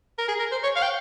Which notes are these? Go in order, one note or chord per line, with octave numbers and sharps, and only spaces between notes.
A#4
G#4
A#4
C5
C#5
F5
G5